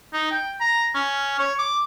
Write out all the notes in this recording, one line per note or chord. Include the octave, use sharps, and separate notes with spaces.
D#4
G5
A#5
C#4
C#5
D6